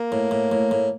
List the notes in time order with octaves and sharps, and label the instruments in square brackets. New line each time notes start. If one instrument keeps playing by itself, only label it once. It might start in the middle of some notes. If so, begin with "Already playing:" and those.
Already playing: [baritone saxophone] A#3
[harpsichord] A2
A2
A2
A2